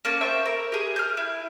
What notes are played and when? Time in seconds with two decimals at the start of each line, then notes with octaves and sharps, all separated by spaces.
0.05 A#3 C#4 A5
0.21 C5 E5 G5 C#6
0.46 A#4
0.72 G4 G#4
0.96 F6 G6
1.17 E4